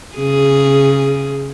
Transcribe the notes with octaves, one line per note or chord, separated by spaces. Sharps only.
C#3 G#4